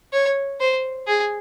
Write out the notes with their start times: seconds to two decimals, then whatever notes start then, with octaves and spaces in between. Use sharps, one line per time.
0.13 C#5
0.60 C5
1.07 G#4